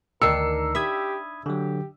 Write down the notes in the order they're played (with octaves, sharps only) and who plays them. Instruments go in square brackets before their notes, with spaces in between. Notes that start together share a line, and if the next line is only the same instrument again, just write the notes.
[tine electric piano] D2 C7 C#7 [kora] D#3 D4 [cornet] A#4 [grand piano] E6
[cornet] G4 [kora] E5 [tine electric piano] B5 D#6 G#6
[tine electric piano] D3 F#3 [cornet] G4